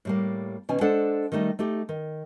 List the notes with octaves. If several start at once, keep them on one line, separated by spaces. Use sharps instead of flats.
A2 G3 A#3
B2 D#3 C#4 G#5
G#3 D4 A4 C5 D5 F#5
D#3 G3 A3 D#4
A3 D#4 G4
D#3